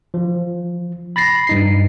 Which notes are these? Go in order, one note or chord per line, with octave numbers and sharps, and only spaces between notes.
F3
B5 A6 A#6 C7
G2 D#4 C7